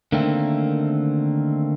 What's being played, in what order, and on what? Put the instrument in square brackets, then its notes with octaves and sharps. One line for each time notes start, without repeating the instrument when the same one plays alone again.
[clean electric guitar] D3 D#3 A3 A#3 C4